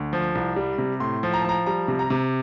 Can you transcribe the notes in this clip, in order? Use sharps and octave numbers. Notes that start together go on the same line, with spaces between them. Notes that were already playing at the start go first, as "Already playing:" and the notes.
Already playing: D2
F3
C2
G3
C3
A2 C6
F3
A#5
A5
F3 A#5
G3 A#5
C3
A#5
C3